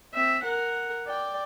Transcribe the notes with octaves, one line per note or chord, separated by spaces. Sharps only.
C4 E5
A#4 F#5
D5 G5